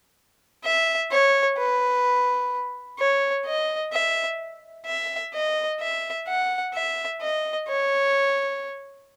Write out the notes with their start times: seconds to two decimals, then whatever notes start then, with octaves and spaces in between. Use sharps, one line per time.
0.64 E5
1.12 C#5
1.58 B4
2.99 C#5
3.46 D#5
3.93 E5
4.86 E5
5.34 D#5
5.80 E5
6.28 F#5
6.74 E5
7.22 D#5
7.68 C#5